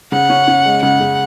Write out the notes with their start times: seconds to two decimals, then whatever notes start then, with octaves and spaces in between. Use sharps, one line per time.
0.12 C#3 F#5
0.30 C#4
0.48 C#4
0.66 G#3
0.83 C#3 F#5
1.00 C#3